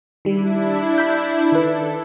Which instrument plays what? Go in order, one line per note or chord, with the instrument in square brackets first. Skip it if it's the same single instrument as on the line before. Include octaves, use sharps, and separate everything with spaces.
[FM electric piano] D#3 G3 [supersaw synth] D4 E4
[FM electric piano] B5 G6
[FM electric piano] D#3 B4 [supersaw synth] A4